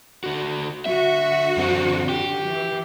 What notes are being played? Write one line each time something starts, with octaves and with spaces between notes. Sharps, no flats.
D3 F#4
D3 F#4 E5
F#2 C4
G4
E3